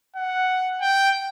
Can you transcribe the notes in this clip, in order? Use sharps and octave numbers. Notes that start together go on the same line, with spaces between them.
F#5
G5